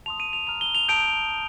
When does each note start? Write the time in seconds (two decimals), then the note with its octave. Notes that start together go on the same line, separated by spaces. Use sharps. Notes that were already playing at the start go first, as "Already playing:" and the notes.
0.06 A5 C6 D#6 F7
0.20 D#7
0.33 F7
0.47 A#5 F6 F7
0.61 G7
0.75 F7
0.89 A5 D#6 G6 D7